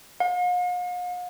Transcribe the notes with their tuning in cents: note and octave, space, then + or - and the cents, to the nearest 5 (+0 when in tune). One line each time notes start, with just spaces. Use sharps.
F5 +45